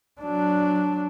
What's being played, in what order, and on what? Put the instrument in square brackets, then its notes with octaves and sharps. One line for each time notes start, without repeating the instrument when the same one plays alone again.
[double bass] F#3 D4